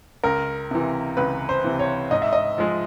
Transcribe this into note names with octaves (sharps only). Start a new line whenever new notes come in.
C#2 A#4
C3 E3
C#2 B4
C5
C3 E3
C#5
G#2 D#5
E5
D#5
F3 G#3